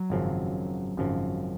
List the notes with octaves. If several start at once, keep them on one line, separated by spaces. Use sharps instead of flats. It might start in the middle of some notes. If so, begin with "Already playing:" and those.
Already playing: F#3
G#1 F#2 C#3 F3
G#1 F#2 C#3 F3